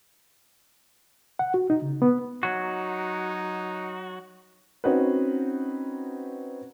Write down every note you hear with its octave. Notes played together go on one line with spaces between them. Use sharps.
F#5
F#4
D#4
C#3
B3
F#3 D#4 F#4
C4 C#4 D#4 F#4 B4